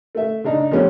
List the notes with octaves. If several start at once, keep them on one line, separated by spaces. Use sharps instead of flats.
A3 E5
C#3 D4 D#4
F3 G3 A3 B3 C#4